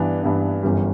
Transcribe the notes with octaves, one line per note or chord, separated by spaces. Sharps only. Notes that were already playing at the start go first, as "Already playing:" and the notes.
Already playing: G2 E3 B3 D4
G2 E3 B3 D4
G1 F#2 E3 G3